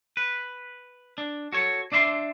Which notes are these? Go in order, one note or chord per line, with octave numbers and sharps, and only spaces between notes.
B4
D4
F#4 A4 C#5
D4 D5 E5 B5 C6